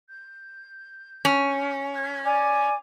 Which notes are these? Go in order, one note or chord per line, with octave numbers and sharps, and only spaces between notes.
G6
C#4
D5 G#5 D6